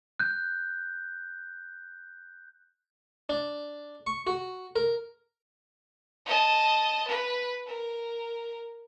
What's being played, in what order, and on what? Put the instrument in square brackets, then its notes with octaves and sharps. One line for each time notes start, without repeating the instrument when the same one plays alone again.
[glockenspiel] F#6 G6
[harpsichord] D4
C#6
F#4
A#4
[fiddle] D#5 A5
B4
A#4